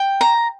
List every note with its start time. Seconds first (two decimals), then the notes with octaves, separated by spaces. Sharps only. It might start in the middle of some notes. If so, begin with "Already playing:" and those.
Already playing: G5
0.21 A#5